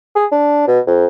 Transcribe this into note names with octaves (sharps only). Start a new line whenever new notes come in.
G#4
D4
B2
F2